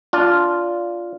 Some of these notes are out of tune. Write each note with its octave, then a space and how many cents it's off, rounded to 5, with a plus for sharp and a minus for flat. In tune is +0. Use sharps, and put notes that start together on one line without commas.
D4 -15 F4 +0